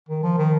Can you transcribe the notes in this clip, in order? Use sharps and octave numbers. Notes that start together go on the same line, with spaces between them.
D#3
F3
D#3